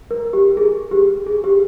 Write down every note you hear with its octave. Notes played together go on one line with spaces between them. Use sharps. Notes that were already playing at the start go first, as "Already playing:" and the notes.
A#4
G4
G#4
G4
G#4
G4